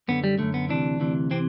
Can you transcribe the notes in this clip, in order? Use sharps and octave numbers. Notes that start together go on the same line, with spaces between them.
F#2 D3 B3
G3
F#2 D3 A3
B3
D2 C3 E3 D4
D2 C3 E3
C3 E3 C4